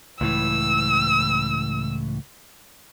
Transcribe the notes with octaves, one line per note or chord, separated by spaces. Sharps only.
C#2 A2 E3 E6